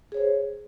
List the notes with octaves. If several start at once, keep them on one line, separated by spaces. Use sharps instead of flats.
G#4 C5 C#5